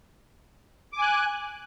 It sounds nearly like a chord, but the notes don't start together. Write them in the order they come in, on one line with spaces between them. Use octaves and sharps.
D6 G#5 F#6